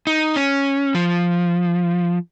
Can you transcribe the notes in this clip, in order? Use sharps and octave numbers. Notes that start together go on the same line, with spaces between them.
D#4
C#4
F3